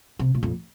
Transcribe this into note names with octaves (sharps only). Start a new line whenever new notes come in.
C3
A#2
F2